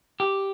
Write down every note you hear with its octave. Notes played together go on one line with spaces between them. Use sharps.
G4